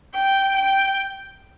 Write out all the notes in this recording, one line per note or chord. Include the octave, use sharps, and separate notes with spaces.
G5
G5